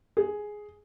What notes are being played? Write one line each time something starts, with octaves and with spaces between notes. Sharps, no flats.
G#4